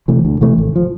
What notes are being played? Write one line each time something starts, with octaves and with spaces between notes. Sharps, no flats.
C3 E3 A3
D2
C3 E3 A3
G#1
F3